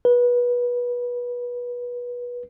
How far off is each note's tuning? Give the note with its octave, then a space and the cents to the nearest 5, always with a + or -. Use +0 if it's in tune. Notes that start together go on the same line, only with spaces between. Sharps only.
B4 -25